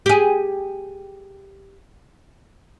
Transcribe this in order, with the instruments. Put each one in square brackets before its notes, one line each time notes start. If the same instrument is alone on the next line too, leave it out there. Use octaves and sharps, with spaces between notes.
[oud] G4 G#4